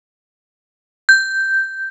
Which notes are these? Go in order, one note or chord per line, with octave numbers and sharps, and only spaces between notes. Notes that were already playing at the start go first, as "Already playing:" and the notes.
G6